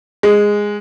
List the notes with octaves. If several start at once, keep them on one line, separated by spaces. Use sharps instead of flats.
G#3